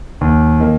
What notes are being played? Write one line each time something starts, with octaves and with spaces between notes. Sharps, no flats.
D#2
D#3 A#3